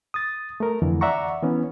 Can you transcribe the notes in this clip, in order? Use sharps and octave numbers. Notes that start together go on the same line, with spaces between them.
D#6 A6
A3 A#4
F2 D3 E3
D5 E5 F#5 A#5 C#6
E3 B3 C#4